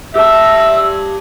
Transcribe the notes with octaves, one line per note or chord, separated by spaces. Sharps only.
G4 E5 A5 E6